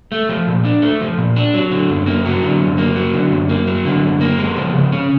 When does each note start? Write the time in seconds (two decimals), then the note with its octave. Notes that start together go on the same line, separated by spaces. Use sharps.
0.12 A3
0.29 F3
0.47 A#2
0.65 D4
0.82 A3
1.01 F3
1.18 A#2
1.36 D4
1.54 F#3
1.71 D3
1.89 F#2
2.06 A#3
2.25 F#3
2.43 D3
2.60 F#2
2.78 A#3
2.96 F#3
3.14 D3
3.31 F#2
3.49 A#3
3.67 F#3
3.85 D3
4.03 F#2
4.21 A#3
4.38 G#3
4.56 F3
4.74 C#3
4.92 C#4